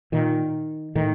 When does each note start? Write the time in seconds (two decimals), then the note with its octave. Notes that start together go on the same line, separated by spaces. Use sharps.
0.12 A#2 D#3
0.95 A2 D#3